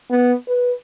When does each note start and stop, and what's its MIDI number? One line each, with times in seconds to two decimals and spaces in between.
0.10 0.33 59
0.48 0.72 71